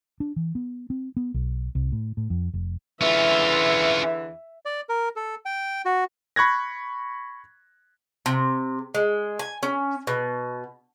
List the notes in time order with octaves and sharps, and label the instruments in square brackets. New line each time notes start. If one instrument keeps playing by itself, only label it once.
[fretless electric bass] D4
E3
B3
C4
B3
B1
C2
A2
A2
F2
F1
[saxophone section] E2 D3 E3 [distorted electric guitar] C#4 F4 [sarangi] E5
[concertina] D5
A#4
A4
G5
F#4
[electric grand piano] B5 C#6 F#6 G#6 A#6
[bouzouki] C3
G#3
G#5
C#4
B2